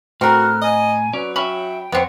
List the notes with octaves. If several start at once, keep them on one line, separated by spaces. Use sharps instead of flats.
A2 C4 F#4 A4 A#4 F6 F#6
D#5 G#5
F#3 C#4 B4 C#5 D5
C#4 E5 G5 B5
F2 B3 C4 C#5 F#5